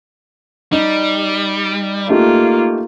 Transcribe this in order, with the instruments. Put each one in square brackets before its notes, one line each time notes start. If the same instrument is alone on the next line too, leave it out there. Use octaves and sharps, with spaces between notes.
[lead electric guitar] G3 [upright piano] D#4
[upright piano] A3 D#4 G4 [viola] A#3 F4